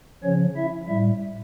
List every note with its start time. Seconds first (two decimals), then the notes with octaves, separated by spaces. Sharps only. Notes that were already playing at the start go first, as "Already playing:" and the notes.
0.24 C#3 F3 C#4 C#5
0.56 E4 E5
0.88 A2 G3 E4 E5